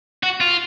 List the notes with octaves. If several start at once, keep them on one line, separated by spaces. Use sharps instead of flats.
F#4
F4